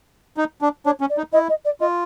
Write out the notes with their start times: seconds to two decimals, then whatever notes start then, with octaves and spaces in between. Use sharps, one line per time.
0.37 D#4
0.62 D4
0.85 D4 C#5
1.01 C#4
1.10 D5
1.18 D#4
1.33 E4 D#5
1.49 D#5
1.65 D5
1.80 F4 D#5